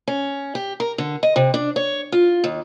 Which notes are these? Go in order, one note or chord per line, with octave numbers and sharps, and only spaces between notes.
C#4
G4
A#4
D3
D#5
C3
D4
C#5
F4
D#2